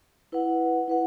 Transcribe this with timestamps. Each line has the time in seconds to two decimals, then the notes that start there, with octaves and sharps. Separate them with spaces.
0.32 E4 B4 F#5
0.88 E4 B4 F#5